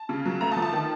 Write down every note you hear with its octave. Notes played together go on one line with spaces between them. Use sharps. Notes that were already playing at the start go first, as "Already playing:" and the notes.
Already playing: A5
C#3
F#3
A3 A#5
A5
F3
A5
D#3